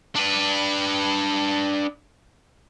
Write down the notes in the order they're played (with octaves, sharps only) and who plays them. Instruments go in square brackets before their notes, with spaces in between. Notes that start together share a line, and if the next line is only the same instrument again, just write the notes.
[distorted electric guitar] D4 B4